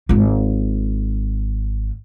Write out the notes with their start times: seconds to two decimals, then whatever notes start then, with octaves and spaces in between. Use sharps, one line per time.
0.09 G#1 F4